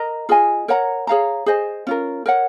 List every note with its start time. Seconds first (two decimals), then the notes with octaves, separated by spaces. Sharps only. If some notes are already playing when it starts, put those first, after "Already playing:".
Already playing: A#4 D#5 A#5
0.29 F4 G#4 D#5 G#5
0.68 A#4 C#5 F#5 A#5
1.07 G#4 C#5 F5 A#5
1.46 G#4 C5 D#5 G#5
1.87 C#4 F4 A#4
2.26 A#4 C#5 F#5